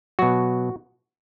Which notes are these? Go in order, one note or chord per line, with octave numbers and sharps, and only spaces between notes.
B2 F#3 F#4